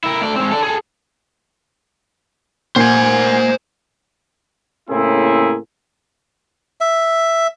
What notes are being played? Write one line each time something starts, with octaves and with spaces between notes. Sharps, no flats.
E4 A#4
A3 D5
G#3 C4
A4 D5
G#4 A4
A#2 C5 G#5
A2 C#3 A#3 C4 E4 G#4
E5